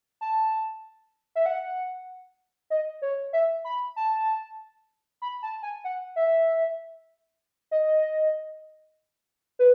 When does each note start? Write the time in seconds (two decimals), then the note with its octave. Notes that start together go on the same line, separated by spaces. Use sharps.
0.21 A5
1.35 E5
1.46 F#5
2.70 D#5
3.02 C#5
3.33 E5
3.65 B5
3.96 A5
5.22 B5
5.43 A5
5.63 G#5
5.84 F#5
6.16 E5
7.71 D#5
9.59 B4